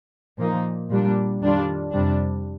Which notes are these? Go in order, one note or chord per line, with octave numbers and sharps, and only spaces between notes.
A#2 F3 A#3 D#4
A#2 G3 D4
F2 D#3 G3 D4 F4
F2 C3 G3 D4